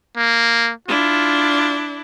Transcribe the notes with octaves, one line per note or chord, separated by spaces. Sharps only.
A#3
D4 E4 F4